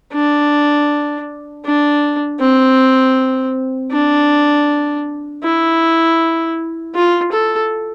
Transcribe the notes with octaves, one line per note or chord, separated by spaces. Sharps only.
D4
D4
C4
D4
E4
F4
A4